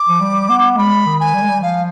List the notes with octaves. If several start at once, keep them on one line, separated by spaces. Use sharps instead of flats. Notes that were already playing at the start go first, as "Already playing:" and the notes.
Already playing: D6
F3
G3
B3
G#3 B5
D#3
G#5
G3
G#3
G3
F3 F5